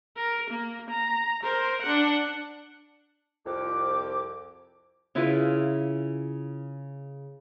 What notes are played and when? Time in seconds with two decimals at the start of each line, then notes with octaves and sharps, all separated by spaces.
0.16 A#4
0.50 A#3
0.90 A#5
1.43 A#4 C5
1.82 D4 F#5
3.45 C2 F2 D6
5.15 C#3 E4 F4 B4